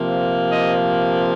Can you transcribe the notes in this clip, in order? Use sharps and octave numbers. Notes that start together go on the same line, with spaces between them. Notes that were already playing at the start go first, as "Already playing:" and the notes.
Already playing: C3 F3 A#3
D#5